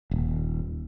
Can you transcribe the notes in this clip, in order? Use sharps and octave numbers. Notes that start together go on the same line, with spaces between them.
D#1